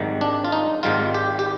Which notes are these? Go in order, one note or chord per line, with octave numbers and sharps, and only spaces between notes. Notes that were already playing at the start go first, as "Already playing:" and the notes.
Already playing: G#1 G#2 D#3 G3
D4
F4
D#4
G#1 G#2 D#3 G3 F4
G4
G4